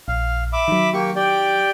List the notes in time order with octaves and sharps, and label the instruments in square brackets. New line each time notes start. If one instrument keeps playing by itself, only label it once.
[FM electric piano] A#1 [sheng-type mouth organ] F5
[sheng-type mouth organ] E5 B5 D6
[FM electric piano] D#3 F#3
[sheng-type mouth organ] A#3 G4 C#6
G4 D5 G5